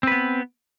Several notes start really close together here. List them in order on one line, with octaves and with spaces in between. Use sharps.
C4 B4 B3